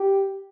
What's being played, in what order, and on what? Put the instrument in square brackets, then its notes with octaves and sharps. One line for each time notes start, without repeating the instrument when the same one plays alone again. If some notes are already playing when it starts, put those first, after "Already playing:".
Already playing: [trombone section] G4